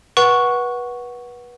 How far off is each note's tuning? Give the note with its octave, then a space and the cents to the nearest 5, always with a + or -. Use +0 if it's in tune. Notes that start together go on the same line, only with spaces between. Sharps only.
B4 -25 F#5 +0 C#6 +0